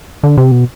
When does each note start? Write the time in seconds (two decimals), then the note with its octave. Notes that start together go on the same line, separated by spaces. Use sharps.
0.23 D3
0.37 C3
0.52 B2